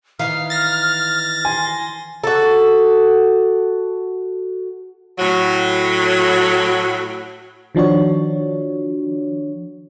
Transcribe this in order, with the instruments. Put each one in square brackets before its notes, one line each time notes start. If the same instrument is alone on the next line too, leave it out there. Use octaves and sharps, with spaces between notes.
[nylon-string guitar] D#3 E3 F5 [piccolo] F6
[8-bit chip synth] A6 A#6
[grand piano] G#5 [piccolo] C6
[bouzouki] F#4 A4
[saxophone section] A2 F#3
[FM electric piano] D#3 F3 D4 F#4 C#5